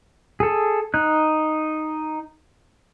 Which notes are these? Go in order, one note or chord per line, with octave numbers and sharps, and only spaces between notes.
G#4 A4
D#4 F#6